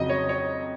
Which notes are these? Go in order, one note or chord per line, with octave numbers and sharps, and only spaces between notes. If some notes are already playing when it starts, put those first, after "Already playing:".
Already playing: F2 C#3 F#3 D#5
C#5
C#5